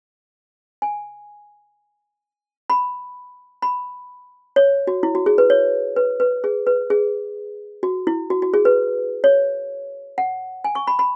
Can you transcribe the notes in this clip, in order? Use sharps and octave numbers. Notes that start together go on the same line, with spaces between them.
G#5
B5
B5
C#5
F#4
E4
F#4
G#4
B4
C#5
B4
B4
G#4
B4
G#4
F#4
E4
F#4
F#4
G#4
B4
C#5
F#5
G#5
C#6
B5
B5